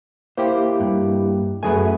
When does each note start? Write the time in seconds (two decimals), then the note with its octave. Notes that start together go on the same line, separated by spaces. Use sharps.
0.37 A#3 E4 G4 C5
0.80 G2
1.63 F#2 F#3 A3 G#4 B4 G#5